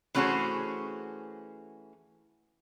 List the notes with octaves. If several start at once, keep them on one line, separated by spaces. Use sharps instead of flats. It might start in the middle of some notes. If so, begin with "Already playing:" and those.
E3 A3 C#4 F#4 G#4 C5